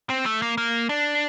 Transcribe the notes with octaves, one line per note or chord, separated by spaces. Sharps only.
C4
A3
A#3
A#3
D4